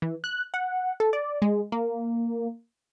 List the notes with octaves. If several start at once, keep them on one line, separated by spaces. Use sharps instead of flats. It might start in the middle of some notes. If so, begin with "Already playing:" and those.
E3
F#6
F#5
A4
D5
G#3
A#3